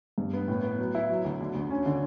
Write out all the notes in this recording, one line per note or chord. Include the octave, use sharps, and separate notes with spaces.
G2
B3
A2
B3
F#3
E4
F#3
D2
D3
D2
C#4
D3